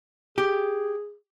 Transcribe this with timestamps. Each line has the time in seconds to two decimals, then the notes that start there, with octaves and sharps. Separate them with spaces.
0.38 G4 G#4